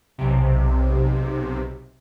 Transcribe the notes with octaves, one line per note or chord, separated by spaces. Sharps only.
B1 C3